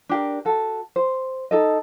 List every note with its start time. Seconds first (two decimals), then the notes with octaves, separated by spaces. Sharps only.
0.09 D4 G4 A#4
0.45 F#4 A4
0.96 C5
1.51 D#4 A4 D#5